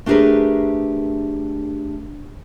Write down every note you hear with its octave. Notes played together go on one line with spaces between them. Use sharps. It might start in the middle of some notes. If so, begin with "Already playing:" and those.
A3 D4 G4 G#4 A#4 B4